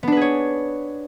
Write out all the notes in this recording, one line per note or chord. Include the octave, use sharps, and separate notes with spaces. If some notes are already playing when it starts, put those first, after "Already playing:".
B3 D4 G#4 B4 C#5